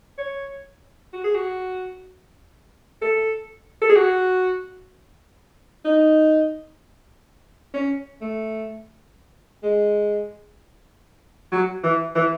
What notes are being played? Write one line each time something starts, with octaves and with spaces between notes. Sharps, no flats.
C#5
F#4
G#4
F#4
A4
A4
G#4
F#4
D#4
C#4
A3
G#3
F#3
E3
E3